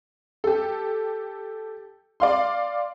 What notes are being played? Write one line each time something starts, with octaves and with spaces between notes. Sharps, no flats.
G4 A4
D5 F5 C6